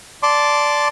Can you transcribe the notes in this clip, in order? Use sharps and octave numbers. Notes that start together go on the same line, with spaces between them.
D5 A5 C6 D6